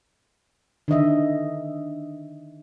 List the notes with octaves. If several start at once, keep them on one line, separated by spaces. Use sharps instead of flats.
D3 D#3 D#5 E5